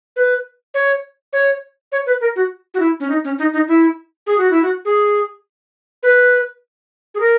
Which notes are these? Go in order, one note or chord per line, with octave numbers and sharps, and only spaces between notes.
B4
C#5
C#5
C#5
B4
A#4
F#4
F#4
E4
C#4
D#4
C#4
D#4
D#4
E4
G#4
F#4
E4
F#4
G#4
B4
G#4
A#4